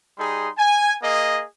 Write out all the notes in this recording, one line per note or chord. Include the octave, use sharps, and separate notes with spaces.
G3 D#4 G#4 C6
G#5
A#3 G#4 D#5